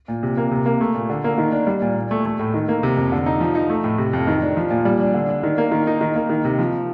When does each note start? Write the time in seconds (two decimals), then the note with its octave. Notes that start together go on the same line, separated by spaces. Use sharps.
0.08 A#2
0.23 C3
0.37 A#3
0.52 C3
0.66 A#3
0.81 A3
0.94 A#2
1.10 D3
1.24 A#3
1.38 D#3
1.52 D4
1.67 G3
1.82 A#2
1.96 A#2
2.11 A3
2.25 A3
2.39 A2
2.54 D#3
2.68 A#3
2.83 C3
2.97 F2
3.12 D3
3.26 D#4
3.41 F3
3.55 D#4
3.70 A3
3.84 A2
3.98 C3
4.13 F2
4.27 D#3
4.42 D4
4.57 F3
4.70 A#2
4.85 G3
5.00 D4
5.14 D3
5.29 D4
5.43 D#3
5.58 A#3
5.72 D#3
5.87 D#4
6.01 D#3
6.15 A#3
6.30 D#3
6.45 C3
6.59 F3